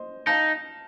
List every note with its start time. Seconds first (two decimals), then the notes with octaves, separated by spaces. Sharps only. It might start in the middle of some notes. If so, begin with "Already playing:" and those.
Already playing: C5 D#5
0.27 D#4 F5 A5